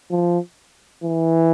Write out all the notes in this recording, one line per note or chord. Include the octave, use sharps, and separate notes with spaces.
F3
E3